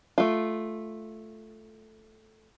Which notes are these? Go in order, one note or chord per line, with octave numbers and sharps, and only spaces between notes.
A3 F4